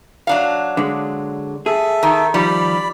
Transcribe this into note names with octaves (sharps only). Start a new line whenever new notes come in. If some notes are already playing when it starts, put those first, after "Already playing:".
F#3 D4 F5
D3 G#3
G#4 A4 E5
D#3
D#3 F3 G3 D5 B5